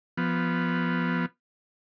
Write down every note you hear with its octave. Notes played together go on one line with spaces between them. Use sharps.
F3 B3